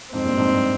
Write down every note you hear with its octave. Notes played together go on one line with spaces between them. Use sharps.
F2 G#2 C4
G2 A#2
F2 G#2
G2